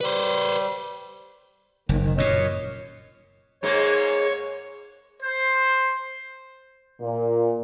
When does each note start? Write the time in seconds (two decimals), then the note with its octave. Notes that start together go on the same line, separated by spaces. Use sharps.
0.01 G3 B4 C5
1.89 F#1 D#2 D#3
2.02 D#3
2.18 F#2 A#2 C#5 D#5
3.63 G#2 G#3 A#3 C#5
5.22 C5
7.01 A#2